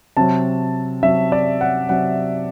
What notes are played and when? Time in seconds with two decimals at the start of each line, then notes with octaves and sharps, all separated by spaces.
0.17 C3 F#3 A5
1.03 C3 F#3 E5
1.32 D5
1.61 F#5
1.89 C3 F#3 F#5